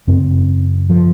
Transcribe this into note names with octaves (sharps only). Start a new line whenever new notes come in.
F#2 C#3 C4
F3